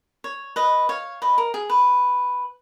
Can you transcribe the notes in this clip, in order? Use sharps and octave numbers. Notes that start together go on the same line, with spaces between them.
C#5
B4 D#5
C#5 F5
B4 D#5
A#4
G#4
B4